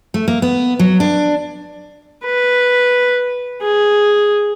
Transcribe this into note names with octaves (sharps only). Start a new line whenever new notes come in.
A3
A#3
B3
F#3
D4
B4
G#4